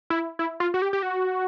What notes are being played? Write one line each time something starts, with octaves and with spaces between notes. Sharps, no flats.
E4
E4
F4
F#4
G4
G4
F#4